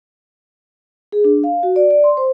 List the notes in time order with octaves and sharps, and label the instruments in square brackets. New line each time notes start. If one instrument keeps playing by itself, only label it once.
[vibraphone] G#4
D4
F5
F#4
D5
D5
C6
C5